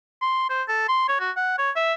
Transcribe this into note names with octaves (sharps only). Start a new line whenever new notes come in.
C6
C5
A4
C6
C#5
F#4
F#5
C#5
E5